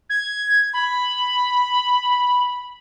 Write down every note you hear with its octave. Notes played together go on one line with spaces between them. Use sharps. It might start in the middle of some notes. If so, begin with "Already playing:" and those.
G#6
B5